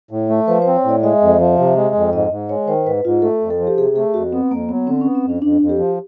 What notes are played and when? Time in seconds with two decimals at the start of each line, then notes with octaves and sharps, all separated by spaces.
0.11 A2
0.29 A3
0.48 F3 B4
0.62 C5
0.67 C4
0.76 C#5
0.84 A2 D5
1.03 G#3 E5
1.22 F2
1.40 F3
1.58 C3
1.76 G#3
1.95 F2
2.13 G#2 D#5
2.31 G#2
2.49 G#3 C#5
2.67 D#3 C5
2.86 G#2 B4
3.05 G#2 F4
3.22 A3 A4
3.42 F2
3.51 A4
3.60 F3
3.67 G4
3.77 C3 G#4
3.96 A3 G#4
4.14 F2 F#4
4.32 B3 C4
4.51 F2 A#3
4.69 F#3 B3
4.87 D3 C4
5.01 B3 C#4
5.15 C4
5.25 F2 C#4
5.42 F2 D4
5.61 F2
5.69 G4
5.78 F3